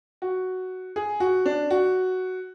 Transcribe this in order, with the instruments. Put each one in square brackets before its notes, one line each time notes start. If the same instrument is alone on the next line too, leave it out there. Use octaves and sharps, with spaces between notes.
[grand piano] F#4
G#4
F#4
D4
F#4